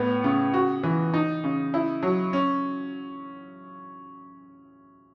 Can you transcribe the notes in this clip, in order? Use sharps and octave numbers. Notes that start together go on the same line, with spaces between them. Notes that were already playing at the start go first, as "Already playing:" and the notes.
Already playing: A2 B3
C#3
F#4
E3
D#4
C#3
E4
F#3
C#4